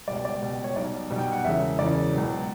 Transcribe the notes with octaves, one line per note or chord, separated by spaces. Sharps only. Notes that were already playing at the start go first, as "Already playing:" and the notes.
C#2 B2 G3 D5
D5
C#2 B2 G3
C#5
B1 B2 G3 D5
B1 B2 G3
G5
F#5
E1 E2 C#3 E3 E5
E1 E2 C#3 E3 D5
C#2 B2 F#3